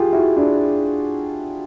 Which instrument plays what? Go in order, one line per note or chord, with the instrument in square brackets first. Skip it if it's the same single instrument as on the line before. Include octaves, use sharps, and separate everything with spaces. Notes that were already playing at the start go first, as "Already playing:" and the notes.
Already playing: [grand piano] F4 G4 G#4
E4 F#4
D4 E4